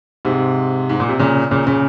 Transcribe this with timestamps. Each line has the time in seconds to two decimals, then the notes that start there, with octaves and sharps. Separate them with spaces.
0.25 G#2 C3
0.89 G#2
1.00 A#2
1.09 C3
1.19 A#2 C#3
1.51 A#2 C#3
1.67 A#2 C#3